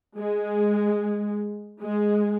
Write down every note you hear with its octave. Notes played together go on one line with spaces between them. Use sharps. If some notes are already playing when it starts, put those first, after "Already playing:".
G#3
G#3